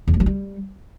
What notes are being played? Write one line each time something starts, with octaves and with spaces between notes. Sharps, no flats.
E2
G2
F#3
G3